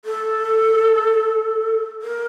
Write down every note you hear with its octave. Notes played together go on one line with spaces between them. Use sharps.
A4
A#4